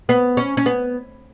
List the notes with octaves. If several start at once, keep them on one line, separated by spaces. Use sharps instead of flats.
B3
C#4
C#4
B3